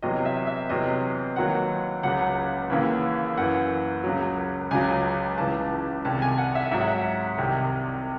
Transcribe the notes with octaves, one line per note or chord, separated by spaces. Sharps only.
E2 C3 F#3 D#5
E5
E5
E2 C3 F#3 D#5
D#2 D#3 F#3 F#5
C#2 C#3 F#3 F#5
D#2 C#3 E3
F#2 E3 F#5
C#2 C#3 F#3
C#2 C#3 F#3 G#5
C#2 C#3 E3 A5
C2 C3 D#3 A5
G#5
F#5
E5
G#2 F#3 E5
F#5
E5
C2 C3 D#3